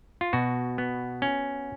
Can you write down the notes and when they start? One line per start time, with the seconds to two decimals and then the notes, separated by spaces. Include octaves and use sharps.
0.21 F4
0.33 B2 F#4
0.78 B3
1.22 C#4